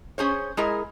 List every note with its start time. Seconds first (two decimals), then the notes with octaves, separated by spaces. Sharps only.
0.18 C#4 G#4 C5 C#5
0.57 G#3 E4 G#4 A#4